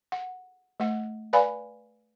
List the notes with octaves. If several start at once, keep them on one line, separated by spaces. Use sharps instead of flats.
F#5
A3 F#5
B4 D5 F5 G#5 B5